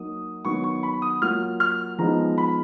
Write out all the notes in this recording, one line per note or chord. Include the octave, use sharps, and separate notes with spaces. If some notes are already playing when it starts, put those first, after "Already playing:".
Already playing: F#3 A#3 D#4 D#6
D#3 F#3 B3 C#6
C#6
B5
D#6
F#3 A#3 F4 F6
F6
F3 G#3 B3 D#4 A#5
B5